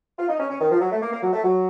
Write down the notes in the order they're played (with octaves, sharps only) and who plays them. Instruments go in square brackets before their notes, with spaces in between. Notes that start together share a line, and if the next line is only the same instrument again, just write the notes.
[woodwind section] F4
D#4
C#4
C#4
D#3
F3
F#3
A3
A#3
A#3
F#3
A3
F#3